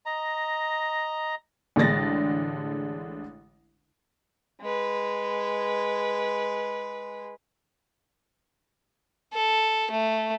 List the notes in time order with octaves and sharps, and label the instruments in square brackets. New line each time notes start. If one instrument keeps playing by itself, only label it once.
[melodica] D#5 A#5
[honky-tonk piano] A1 D3 G#3 D4 A6 A#6
[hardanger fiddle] G#3 B4
[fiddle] A4
A3